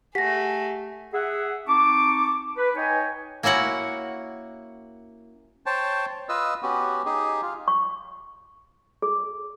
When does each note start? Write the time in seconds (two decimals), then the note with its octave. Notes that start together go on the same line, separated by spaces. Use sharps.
0.15 A3 G4 G#4 F#5 A#6 B6
1.14 G#4 E5 F#5
1.67 C4 D#4 A5 C#6 D6
2.58 B4
2.76 D#4 C#5 D#5 G5 G#5
3.43 A#3 C#4 E4 F#4 F#5
5.66 C5 C#5 G5 A5
6.29 F4 B4 D#5 E6
6.63 B3 C#4 F#4 G4
7.05 D#4 G4 G#4
7.42 F4
7.68 C#6
9.02 G#4